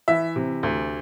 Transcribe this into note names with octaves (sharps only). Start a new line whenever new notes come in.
E3 E5
C3
D2